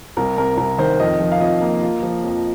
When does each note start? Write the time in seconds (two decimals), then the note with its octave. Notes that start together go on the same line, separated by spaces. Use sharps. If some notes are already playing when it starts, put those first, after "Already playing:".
0.17 C2 A#4
0.37 C3 A#4
0.57 C2 A#4
0.78 D#3 C5
1.00 F2 D#5
1.20 F3
1.32 F5
1.41 F2 D#5
1.61 A#3
1.82 F4
2.03 F3
2.24 F2